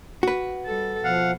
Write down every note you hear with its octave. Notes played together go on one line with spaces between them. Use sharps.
F#4 B4
G3 A4
B2 F3 F5 F#5